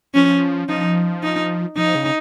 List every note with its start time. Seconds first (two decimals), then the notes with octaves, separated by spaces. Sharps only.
0.14 F3 C#4
0.68 F3 D#4
1.23 D#4
1.77 F3 D#4
1.95 C#3